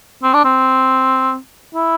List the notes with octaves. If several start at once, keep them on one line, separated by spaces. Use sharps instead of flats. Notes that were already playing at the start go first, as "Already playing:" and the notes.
C4
D4
C4
E4